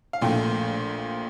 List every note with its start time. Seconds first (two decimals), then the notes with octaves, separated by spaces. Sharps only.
0.13 F5
0.21 A#1 A#2 F3 A3 G5